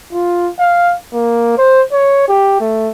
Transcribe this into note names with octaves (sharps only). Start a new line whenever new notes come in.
F4
F5
A#3
C5
C#5
G4
A3